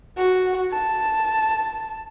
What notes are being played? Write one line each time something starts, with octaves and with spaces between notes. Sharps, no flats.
F#4
A5